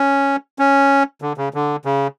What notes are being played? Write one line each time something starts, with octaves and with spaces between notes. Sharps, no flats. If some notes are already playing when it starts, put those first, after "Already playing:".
Already playing: C#4
C#4
D3
C#3
D3
C#3